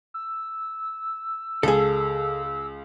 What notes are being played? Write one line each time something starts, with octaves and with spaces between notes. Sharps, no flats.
E6
C#2 G#4 A4